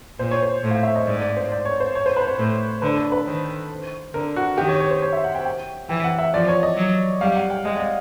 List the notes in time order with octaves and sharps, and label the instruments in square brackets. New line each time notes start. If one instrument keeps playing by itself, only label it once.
[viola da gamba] A#2 [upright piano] C5
[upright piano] C#5
C5
[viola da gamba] A2
[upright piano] F5
E5
D#5
[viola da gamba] G#2 [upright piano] D5
[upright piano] D5
C5
D5
C#5
C5
C#5
C5
B4
C5
[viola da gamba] A2
[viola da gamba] D3 [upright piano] B4
[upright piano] A4
B4
[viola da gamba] D#3 [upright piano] C5
[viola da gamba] D3 [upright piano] A#4
[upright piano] F#4
[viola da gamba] D#3 [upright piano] G4
[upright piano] C#5
C#5
C5
C#5
E5
F#5
G5
G5
[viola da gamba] E3 [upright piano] G5
[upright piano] F#5
E5
[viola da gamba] F3 [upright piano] D5
[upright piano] C#5
D#5
[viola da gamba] F#3
[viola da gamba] G3 [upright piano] F5
[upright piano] F#5
G5
[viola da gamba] G#3 [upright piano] D#5
[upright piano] D5
D#5